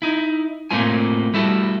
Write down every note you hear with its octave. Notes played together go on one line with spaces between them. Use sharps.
D#4 E4
A2 A3 A#3 C4 F4 G#5
G3 A3 E4 F#4 A4